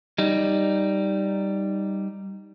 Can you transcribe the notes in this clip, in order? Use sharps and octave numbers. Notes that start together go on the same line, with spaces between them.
G3 D#4